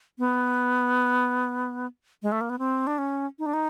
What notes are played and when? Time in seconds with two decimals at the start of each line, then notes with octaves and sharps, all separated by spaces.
0.18 B3
2.22 G#3
2.32 A3
2.41 A#3
2.50 B3
2.59 C4
2.87 D4
2.98 C#4
3.39 D#4
3.46 D4
3.53 D#4